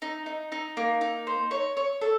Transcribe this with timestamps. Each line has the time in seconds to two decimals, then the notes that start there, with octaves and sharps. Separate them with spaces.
0.02 D#4
0.26 D#4
0.52 D#4
0.77 A#3
1.01 D#4
1.27 C5
1.51 C#5
1.77 C#5
2.01 A4